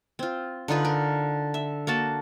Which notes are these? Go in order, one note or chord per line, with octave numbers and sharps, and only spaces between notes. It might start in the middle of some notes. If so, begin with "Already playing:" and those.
C4 F4
D3 D#4 F4 B4
A#4
E5
A#3 F#4 A5